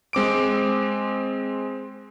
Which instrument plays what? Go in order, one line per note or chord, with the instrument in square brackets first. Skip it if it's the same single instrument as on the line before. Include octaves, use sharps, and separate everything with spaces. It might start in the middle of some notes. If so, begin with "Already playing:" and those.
[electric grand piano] G#3 C4 D6 D7